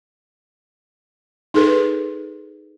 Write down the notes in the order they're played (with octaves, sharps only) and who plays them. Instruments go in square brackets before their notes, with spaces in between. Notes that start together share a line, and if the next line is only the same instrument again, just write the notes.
[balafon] D#4 G#4 A4 B4